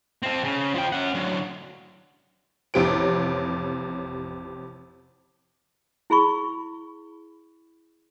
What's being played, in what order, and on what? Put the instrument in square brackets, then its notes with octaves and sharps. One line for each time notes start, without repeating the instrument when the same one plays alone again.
[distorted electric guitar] C4 A4
C#3
F3 G5
C#4 F#5
D3 F#3
[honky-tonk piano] A1 F2 C3 G4 C#5 D7
[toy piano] E4 G#4 B5 C#6